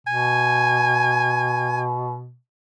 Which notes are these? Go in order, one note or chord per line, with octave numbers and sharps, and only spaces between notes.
B2 G#5